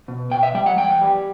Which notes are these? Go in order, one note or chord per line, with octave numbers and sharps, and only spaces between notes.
B2
B2 G5
E5
G3 G5
F#5
E2 G5
G3